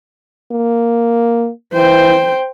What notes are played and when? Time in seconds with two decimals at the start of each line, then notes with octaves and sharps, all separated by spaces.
0.52 A#3
1.73 E3 C5 G5